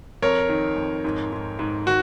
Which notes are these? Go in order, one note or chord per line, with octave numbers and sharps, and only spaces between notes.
F2 A#4 C#5
D#3
F2
G#2
G#2
G#2
D#3 F#4